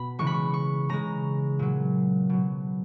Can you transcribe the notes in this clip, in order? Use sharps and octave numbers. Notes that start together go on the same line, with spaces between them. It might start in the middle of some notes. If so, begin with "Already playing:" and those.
Already playing: B2 B5
C#3 E3 G#3 C#6
B5
C#6
C#6
C#3 G#3 A#5
A#2 F#3
B2 F#3